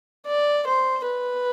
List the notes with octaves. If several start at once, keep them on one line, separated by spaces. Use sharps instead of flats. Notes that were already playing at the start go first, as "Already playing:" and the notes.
D5
C5
B4